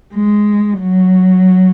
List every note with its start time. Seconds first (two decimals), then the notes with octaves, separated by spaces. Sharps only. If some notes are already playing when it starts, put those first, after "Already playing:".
0.14 G#3
0.79 F#3